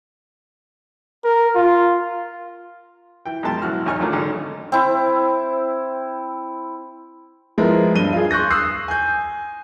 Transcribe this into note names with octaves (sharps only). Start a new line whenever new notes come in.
A#4
F4
E3 G5
F#2 B2 G#3 G5 A5 C6
A1 E3 F#4 F6
G#1 D#2 D#4 G#5 C#6 F6
F3 F#3 A3 A#3 C#4 D4
G#1 D3 G#3 D#4
C4 E4
F3 G#3 B3 E4 A#4
G2 D#7 G7
F4 G#4
C6 C#6 F#6 G6 A#6
D#6 E6 F#6 C7
G#5 G6